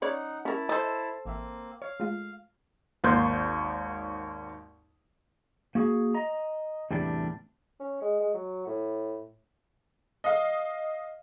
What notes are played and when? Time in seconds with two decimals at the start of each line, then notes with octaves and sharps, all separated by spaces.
0.02 C#4 D#4 C#5 D5 F#5
0.45 C#4 E4 A#4 A5
0.69 A4 C5 D#5
1.25 A1 A#3 C4 E5
1.82 C#5 F5
2.00 G#3 A3 F4
3.04 G#1 D#2 C6 G6
5.75 A#3 F#4 G#4
6.14 D#5 A#5
6.91 E2 A2 C3 G3 D4
7.80 C#4
8.01 G#3
8.20 G#3
8.34 F#3
8.66 A2
10.24 D#5 F5